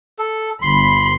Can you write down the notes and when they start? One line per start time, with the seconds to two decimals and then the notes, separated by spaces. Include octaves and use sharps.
0.19 A4
0.62 G1 B5 C6